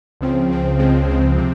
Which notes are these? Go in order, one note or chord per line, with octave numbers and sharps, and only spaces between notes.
C#2 C#3 F3 C4
C#2 C#3 F3 C4
C#2 C#3 F3 G#3 C4
C#2 C#3 F3 G#3 C4
C3 F3 C4